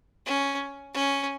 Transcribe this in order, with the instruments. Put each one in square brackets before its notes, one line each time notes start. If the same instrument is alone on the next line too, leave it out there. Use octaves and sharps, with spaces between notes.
[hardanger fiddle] C#4
C#4